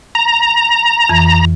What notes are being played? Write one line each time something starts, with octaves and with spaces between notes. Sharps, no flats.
A#5
F2 E3